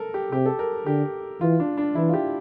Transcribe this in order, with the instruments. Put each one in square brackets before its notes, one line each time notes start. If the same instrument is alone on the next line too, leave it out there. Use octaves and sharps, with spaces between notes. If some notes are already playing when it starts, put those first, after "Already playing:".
Already playing: [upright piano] A4 A#4
G4
[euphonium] C3 [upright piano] G4
[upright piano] A4
A#4
[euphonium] D3 [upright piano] G4
[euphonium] E3 [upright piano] F4
[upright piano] D4
D4
[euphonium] E3 [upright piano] E4
[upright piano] F4
G4